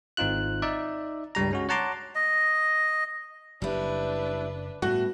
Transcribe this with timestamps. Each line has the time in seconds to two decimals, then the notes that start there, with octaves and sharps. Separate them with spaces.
0.17 G#1 C4 D#4 F4 F#6
0.62 D#4 D5 E5
1.35 C#2 G2 G3 A#5
1.51 G#3 C#4 F#4
1.69 C#5 F#5 A5 A#5 C6 D6
2.15 D#5
3.62 F#1 G3 D4 E4 B4
4.82 A2 G3 B3 F#4